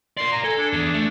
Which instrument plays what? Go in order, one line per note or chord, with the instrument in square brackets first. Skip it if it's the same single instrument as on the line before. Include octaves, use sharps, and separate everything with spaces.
[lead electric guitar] A#4 D5 [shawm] C6
[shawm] A#5
[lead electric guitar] A4 [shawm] G#5
[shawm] D4
[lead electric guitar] E2
A3